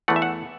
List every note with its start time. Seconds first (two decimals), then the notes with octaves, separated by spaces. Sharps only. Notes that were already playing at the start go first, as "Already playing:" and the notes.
0.08 E2 E3 A3 F#5
0.16 E5
0.22 F#5